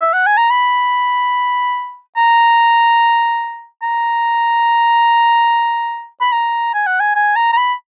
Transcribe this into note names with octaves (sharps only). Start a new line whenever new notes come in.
E5
F#5
G#5
A#5
B5
A#5
A#5
B5
A#5
G#5
F#5
G#5
G#5
A#5
A#5
B5